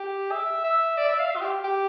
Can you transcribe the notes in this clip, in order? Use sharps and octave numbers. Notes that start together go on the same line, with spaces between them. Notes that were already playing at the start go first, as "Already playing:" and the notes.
Already playing: G4
E5
E5
D5
E5
F5
E5
F4
G4
G4